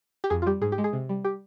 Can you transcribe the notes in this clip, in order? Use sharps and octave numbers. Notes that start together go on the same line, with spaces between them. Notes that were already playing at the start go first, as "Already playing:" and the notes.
G4
F2 G#4
F4
G3 G4
G#2 G#4
G4
G#3
G#4
C3
G3
G4